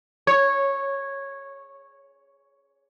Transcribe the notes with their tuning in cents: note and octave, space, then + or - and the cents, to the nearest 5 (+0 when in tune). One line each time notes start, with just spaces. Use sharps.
C#5 -10